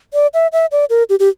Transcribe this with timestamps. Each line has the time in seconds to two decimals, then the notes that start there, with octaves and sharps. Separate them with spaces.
0.14 D5
0.34 E5
0.53 E5
0.72 D5
0.90 A#4
1.09 G4
1.20 G4